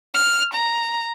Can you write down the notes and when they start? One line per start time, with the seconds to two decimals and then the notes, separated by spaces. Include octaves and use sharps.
0.14 F6
0.54 A#5